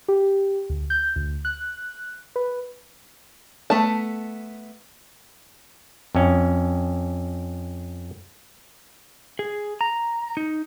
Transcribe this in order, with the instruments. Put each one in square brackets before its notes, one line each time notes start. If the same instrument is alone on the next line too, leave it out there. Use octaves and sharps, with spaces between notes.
[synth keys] G4
D2
G6
D2
F#6
B4
[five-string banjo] A3 B3 A5
[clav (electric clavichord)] F2 C#4
[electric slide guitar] G#4
A#5
D#4